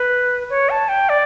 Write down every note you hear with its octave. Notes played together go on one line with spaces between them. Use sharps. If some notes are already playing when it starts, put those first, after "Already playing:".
Already playing: B4
C#5
A5
G5
D5